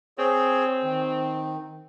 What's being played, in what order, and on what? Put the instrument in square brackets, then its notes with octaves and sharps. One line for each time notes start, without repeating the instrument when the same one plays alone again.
[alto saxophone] C4 [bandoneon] G#4 C#5
[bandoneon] D#3